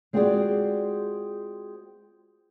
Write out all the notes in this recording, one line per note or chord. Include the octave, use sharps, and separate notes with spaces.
G#3 C4 F4 F#4 G#4 D5